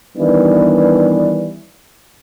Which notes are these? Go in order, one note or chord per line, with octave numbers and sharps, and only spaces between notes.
D#3 E3 G3 B3 D4 D5